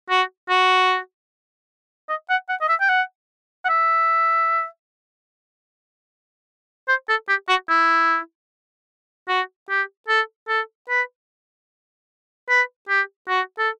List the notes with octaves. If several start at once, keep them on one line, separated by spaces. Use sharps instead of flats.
F#4
F#4
D#5
F#5
F#5
D#5
E5
G5
F#5
F#5
E5
C5
A4
G4
F#4
E4
F#4
G4
A4
A4
B4
B4
G4
F#4
A4